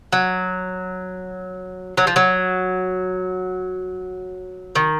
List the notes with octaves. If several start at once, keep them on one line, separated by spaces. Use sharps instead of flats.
F#3
F#3
F3
F#3
D#3